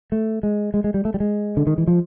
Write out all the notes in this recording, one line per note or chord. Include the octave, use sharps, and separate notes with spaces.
A3
G#3
G#3
G#3
G3
A3
G3
G#3
D3
D#3
E3
F3